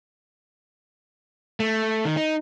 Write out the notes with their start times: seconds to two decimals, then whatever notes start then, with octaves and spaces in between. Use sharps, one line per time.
1.60 A3
2.05 D#3
2.17 D#4